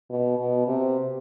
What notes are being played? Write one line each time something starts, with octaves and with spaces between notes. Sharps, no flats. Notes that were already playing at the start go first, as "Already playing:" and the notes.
B2
B2
C3